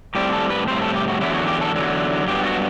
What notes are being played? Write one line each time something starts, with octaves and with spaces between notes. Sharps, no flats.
A2 G3 C4 G4
A4
B4
A2 G3 C4 C5
A4
G4
F#4
E2 D3 F#3 E4
F#4
G4
A4
E2 D3 F#3
G2 F#3 B3 G4
F#4